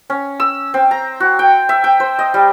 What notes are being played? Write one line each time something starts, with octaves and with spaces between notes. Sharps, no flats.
C#4
E6
C4
A#5
F#4
G5
E5
G5
C5
D#5
G3